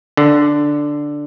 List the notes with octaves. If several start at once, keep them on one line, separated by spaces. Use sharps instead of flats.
D3